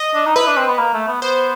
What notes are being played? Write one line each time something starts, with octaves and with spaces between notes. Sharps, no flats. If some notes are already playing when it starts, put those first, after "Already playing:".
Already playing: D#5
D4
D#4
E4 B4
D4
C4
B3
A#3
A3
B3
B3 C5